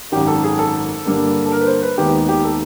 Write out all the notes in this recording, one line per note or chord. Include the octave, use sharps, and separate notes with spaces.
G#1 F#2 D#3 G4
A4
G#4
A4
G2 D3 G3 A#3
A4
A#4
B4
C5
B4
D#2 D#3 G#3 B3 G4
G4
A4